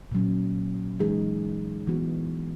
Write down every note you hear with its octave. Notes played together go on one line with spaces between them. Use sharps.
A#2 F#3 C#4
E3 G#3 D#4 G#4
E3 B3 F#4